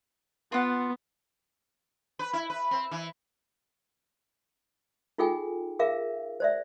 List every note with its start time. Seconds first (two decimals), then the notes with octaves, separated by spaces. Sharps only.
0.52 B3 F4 F#5
2.19 B4
2.33 E4
2.50 B4
2.71 C4
2.91 E3
5.18 D#4 F4 G#4 A4 G5 G#5
5.79 G#4 A#4 E5 F5
6.40 C5 D5 E5